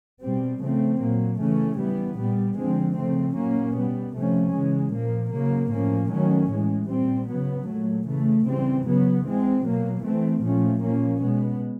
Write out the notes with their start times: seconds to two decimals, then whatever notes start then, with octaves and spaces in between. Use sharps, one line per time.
0.21 B2 G3 C4
0.60 C#3 F3 A3 C4
1.00 A#2 F#3 A#3
1.40 C#3 E3 A3 C#4
1.78 E3 G3 B3
2.18 A#2 G3 B3
2.57 D3 F3 G#3 C4
2.96 C#3 F3 A3 C4
3.35 A#2 F#3 A#3 C#4
3.75 B2 G3 B3
4.14 C3 F3 A3 C#4
4.54 C#3 E3 G#3
4.92 A#2 F3 A#3
5.32 C#3 F#3 A#3
5.71 A2 F3 A#3 C#4
6.11 D#3 F#3 A3 C#4
6.49 A2 E3 G#3
6.88 A#2 G3 C4
7.28 C#3 F#3 B3
7.67 A#2 F#3 A3
8.07 C#3 E3 A3
8.46 C#3 E3 G3 C4
8.84 C#3 F#3 B3
9.24 E3 G#3 C4
9.64 B2 F#3 A#3
10.02 E3 A3 C4
10.42 A#2 F3 A3 C#4
10.81 A#2 F3 A#3 C#4
11.20 B2 G#3 B3